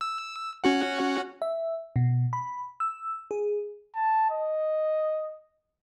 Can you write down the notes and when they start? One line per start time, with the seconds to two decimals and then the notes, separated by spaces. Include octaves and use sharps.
0.01 E6
0.64 C#4 F#4 F#5
1.42 E5
1.96 B2
2.33 B5
2.80 E6
3.31 G#4
3.95 A5
4.30 D#5